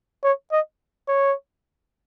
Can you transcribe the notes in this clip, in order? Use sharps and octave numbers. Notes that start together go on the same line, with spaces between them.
C#5
D#5
C#5